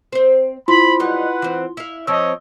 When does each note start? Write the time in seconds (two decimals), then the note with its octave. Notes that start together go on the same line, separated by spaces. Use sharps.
0.12 C4 C5
0.68 C4 E4 F4 B5 C6
1.00 F#3 G3 D#4 B4 F#5
1.42 E3 C4
1.77 E4 F5
2.07 F3 C4 C#5 D#5 E6